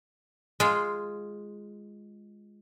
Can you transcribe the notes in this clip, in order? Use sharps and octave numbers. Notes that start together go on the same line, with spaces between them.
G#3 F4